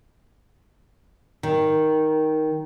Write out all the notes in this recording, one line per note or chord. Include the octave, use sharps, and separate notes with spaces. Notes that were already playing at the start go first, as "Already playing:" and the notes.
D#3